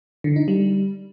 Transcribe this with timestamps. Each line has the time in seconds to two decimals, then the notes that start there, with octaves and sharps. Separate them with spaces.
0.24 D3
0.36 D#4
0.48 G3